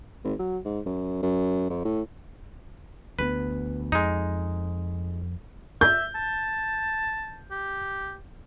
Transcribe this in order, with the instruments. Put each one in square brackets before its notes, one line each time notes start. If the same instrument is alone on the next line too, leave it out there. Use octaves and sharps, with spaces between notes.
[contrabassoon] G#1
F#3
G#2
F#2
F#2
F2
A2
[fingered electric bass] D2 G#3 B3 [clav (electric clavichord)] B4
[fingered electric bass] F2 [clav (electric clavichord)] G#3 D#4
[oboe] E5 [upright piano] G6
[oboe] A5
G4